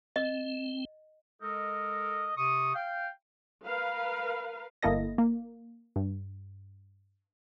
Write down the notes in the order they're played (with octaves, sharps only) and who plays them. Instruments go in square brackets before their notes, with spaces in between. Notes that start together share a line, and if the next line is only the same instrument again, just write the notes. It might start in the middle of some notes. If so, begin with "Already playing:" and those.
[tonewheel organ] C4 [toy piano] D#5
[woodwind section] G#3 A4 A#4 D#5
C3 C#6 D#6
F5 G5
[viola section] A#4 B4 F5
[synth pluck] G1 A#3 E4 A4 D#5 A#6
A#3
G2